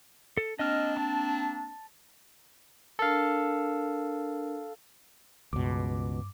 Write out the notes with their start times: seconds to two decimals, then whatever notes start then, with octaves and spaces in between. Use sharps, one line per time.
0.37 A4
0.59 A#3 C4 D4 D#5 F6
0.97 A5
2.99 D4 A4 A#4 F5
5.53 C#2 G2 B2 D6